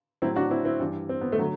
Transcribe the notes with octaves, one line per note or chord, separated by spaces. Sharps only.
A2 F#3 C4 E4
D4 F#4
C4 E4
C4 E4
G2 E3 G3
C4
B3
A3
D3 F#3